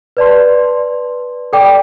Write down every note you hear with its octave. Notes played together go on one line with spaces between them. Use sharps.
B4 D5 A5 C6
A4 D5 G5 D6